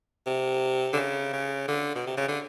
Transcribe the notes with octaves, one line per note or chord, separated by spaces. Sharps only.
C3
D3
C#3
C#3
D3
B2
C3
C#3
D3